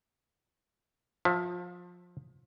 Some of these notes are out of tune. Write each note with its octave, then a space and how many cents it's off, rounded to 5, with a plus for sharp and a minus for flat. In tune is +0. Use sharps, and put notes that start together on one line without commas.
F3 +25 E5 +0